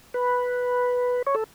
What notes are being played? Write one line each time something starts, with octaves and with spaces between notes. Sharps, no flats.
B4
C#5
A4